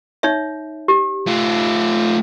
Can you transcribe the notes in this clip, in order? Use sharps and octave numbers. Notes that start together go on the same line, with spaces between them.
D#4 C#5 E5
G4
A3 F4